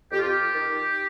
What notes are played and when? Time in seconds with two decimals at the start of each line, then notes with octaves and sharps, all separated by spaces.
0.12 F2 G4
0.19 F4
0.28 G4
0.54 D#3